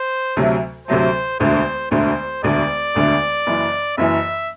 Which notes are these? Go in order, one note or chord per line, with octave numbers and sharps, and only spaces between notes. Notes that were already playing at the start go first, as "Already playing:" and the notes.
Already playing: C5
D2 C3 F#3 A3
D2 C3 F#3 A3 C5
E1 D2 D3 A3 C5
E1 D2 D3 A3 C5
E1 D2 D3 A3 D5
E1 D2 D3 A3
F#1 F#2 E3
F#1 F#2 E3 E5